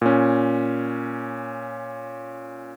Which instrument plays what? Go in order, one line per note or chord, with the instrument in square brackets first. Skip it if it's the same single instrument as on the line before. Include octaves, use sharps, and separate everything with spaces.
[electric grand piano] A#2 C#4